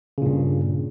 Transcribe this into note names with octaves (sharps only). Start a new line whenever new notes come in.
G2 A#2 C#3